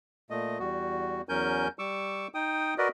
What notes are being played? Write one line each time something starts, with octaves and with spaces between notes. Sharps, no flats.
A#2 A3 D#5
E2 G3 F#4
E2 F#3 C#4 A#4 G#5 G6
G3 C#6 D6 E6
D#4 G5 D#6
F#4 A#4 B4 D5 D#5